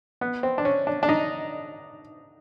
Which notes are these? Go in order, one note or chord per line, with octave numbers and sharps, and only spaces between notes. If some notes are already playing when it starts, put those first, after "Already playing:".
B3
C4
D4
C#4
D4
D4
D#4